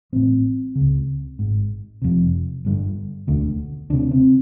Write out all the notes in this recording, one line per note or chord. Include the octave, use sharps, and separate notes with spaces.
A1 A2 C4
C#3
C#2
G#1 G#2
F1 F2 C3
G1 G2 D3
E1 D2 D3
D2 C3 D4
C4